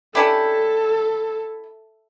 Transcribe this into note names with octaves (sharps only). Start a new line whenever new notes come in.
C#4 D4 E4 G4 A4